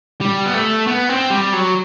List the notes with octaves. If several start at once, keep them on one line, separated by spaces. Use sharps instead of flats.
G3
B3
A3
B3
C4
G3
F#3